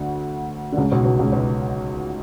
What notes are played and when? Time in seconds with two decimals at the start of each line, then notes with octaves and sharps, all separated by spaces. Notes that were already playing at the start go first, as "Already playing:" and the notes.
Already playing: D2 D3
0.72 D3
0.77 C#2 C#3
0.91 B1 B2
1.05 B1 B2
1.19 C#2 C#3
1.32 B1 B2